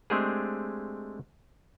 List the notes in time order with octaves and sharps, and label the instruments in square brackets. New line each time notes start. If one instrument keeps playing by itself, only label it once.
[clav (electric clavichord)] G#3 A3 C4 D4 G4 G#4